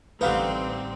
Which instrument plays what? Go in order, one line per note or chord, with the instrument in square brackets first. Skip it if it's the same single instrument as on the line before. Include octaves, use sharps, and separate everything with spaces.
[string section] A1 C4 [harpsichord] D3 G3 D#4 [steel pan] B4 F5